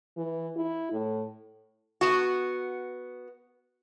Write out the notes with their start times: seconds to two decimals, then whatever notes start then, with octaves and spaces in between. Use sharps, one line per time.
0.17 E3
0.57 E4
0.92 A2
2.01 B3 F#4